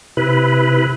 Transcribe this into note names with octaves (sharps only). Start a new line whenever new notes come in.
C3 E4 B4